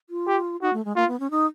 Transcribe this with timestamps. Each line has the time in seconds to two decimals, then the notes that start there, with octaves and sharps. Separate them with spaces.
0.10 F4
0.27 G4
0.62 D#4 F#4
0.73 A3
0.85 G#3
0.96 A#3 F4
1.08 B3
1.20 C#4
1.31 D#4